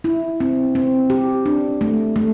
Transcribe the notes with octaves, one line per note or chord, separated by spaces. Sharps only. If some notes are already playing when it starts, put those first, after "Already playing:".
E4
C4
C4
G4
D4
A3
A3